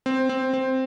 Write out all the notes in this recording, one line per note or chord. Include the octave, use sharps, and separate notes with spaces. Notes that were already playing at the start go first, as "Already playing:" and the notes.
C4
C4
C4